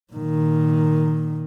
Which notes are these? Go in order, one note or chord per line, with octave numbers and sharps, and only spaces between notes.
A#2 D#3